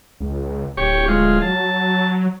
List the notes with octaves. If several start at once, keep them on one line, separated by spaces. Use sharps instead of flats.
C#2
D1 G4 C#5 C#6
G#3 F4
F#3 A5